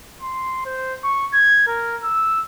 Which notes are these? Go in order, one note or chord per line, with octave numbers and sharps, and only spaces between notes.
C6
C5
C#6
G#6
A#4
E6